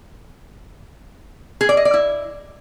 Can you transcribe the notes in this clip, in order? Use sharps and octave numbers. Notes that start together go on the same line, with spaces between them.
G#4
D5
D#5
D5
E4